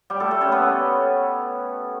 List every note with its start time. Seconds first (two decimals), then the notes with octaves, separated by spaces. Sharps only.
0.10 G3 G4
0.20 A3 A4
0.31 A3 A4
0.41 C#4 C#5
0.52 B3 B4